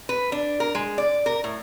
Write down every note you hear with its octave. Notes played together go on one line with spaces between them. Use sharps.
B4
D4
A#4
G#3
D5
A#4
A2